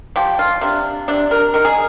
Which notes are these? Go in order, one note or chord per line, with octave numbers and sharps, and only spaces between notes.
F3 G4
F4
C3 D4
C3 D4
A#4
D#3 A#4
G#4